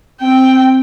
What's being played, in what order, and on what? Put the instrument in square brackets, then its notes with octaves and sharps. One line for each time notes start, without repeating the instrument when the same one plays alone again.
[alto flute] C4 [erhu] G5